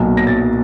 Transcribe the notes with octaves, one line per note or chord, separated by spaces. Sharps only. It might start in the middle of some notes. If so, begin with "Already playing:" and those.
Already playing: B1 A#2 F#3
A#6
A6